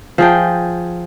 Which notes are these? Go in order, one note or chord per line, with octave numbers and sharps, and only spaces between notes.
F3 G#4 G5